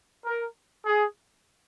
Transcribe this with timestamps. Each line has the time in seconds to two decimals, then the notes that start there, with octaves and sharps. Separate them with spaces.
0.25 A#4
0.86 G#4